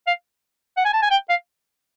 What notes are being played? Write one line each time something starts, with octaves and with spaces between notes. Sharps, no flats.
F5
F#5
G#5
A5
G#5
G5
F5